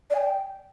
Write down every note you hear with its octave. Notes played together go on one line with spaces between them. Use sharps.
D5
G#5
G5